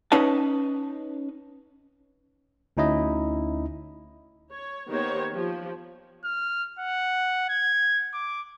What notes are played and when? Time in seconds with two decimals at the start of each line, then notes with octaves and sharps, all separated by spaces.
0.12 C#4 D#4 B4 D#5 A5
2.77 D2 C#4 D#4 E4 D#5
4.52 C#5
4.89 D#3 A#3 B3 G4 C5 C#5
5.30 F3 G4
6.24 F6
6.79 F#5
7.49 G#6
8.14 D6